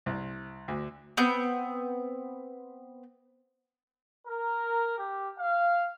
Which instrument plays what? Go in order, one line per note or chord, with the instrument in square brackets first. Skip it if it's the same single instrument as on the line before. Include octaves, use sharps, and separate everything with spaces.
[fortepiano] C2
D2
[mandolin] B3 C4 G6
[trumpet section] A#4
G4
F5